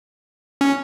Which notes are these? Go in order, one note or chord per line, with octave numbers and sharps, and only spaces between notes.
C#4